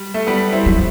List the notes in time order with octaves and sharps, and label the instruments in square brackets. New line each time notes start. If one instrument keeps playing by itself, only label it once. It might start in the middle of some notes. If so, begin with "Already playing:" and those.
Already playing: [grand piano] G3
A3
G3 B3
C4 E4
[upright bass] F#3